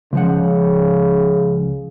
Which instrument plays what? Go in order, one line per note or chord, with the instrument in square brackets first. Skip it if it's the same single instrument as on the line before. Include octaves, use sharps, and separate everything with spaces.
[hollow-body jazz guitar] C#2 F3 F#5 [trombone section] C#3